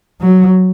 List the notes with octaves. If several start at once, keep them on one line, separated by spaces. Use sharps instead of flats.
F#3